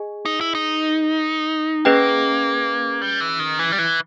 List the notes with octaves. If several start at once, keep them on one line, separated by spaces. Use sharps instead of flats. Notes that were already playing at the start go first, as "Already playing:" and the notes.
Already playing: G#4 D#5 G#5
D#4
E4
D#4
A#3 C#4 G#4 B4 D#5 G5
G3
E3
D#3
E3
G3
E3